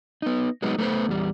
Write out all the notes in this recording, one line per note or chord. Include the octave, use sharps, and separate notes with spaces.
B3 D#4
F#3 G#3 B3 D#4
A3 B3 C4 B4 C5
E2 G3